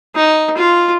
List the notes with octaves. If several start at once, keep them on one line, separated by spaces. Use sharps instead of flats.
D#4
F4